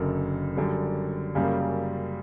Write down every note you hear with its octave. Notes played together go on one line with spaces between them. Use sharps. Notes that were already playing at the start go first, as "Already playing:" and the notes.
Already playing: F#1 F#2 D3
F#2 D3 G3
F#2 C#3 G3 A#3